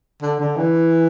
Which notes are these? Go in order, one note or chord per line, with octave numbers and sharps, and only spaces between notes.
D3
D3
E3